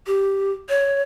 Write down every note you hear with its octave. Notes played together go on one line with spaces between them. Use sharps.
G4
C#5